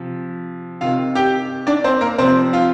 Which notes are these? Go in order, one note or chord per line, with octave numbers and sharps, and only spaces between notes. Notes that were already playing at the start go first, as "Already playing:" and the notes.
Already playing: C3 F3
C3 D#3 F4 F5
G4 G5
D4 D5
C4 C5
A#3 A#4
C3 F3 C4 C5
F4 F5